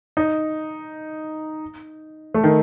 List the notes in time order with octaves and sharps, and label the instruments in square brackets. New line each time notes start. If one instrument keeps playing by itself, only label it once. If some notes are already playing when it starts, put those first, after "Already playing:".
[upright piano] D#4
A3
D#3